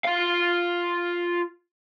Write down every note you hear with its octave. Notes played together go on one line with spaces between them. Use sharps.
F4 F5